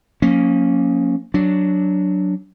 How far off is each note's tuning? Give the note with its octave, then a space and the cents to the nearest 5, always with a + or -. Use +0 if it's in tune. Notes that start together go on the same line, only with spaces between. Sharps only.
F3 +45 A#3 +0 C#4 +0
F#3 +0 D4 -5